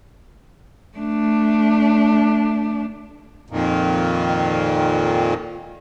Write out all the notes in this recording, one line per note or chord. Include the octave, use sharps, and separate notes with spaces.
A3 D4
F2 A#2 D#3